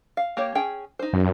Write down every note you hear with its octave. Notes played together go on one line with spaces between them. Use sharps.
F5
A#3 G4 C#5
C#4 G#4 G5
D#4 C5
F#2